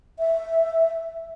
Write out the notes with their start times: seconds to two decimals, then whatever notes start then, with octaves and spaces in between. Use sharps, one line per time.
0.19 E5